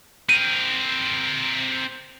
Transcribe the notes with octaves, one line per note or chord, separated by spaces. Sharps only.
C4 A#4 D#7